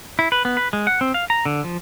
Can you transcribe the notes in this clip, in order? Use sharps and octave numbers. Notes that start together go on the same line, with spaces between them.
E4
B4
B3
B4
G#3
F#5
C4
F5
A#5
D3
F3